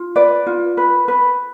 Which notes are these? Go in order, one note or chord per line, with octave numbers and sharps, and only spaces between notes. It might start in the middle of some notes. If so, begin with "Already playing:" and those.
Already playing: F4
B4 D5
F4
B4
B4